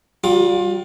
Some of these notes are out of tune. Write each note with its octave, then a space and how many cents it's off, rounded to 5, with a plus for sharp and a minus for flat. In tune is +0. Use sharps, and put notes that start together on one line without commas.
G3 -25 F4 +30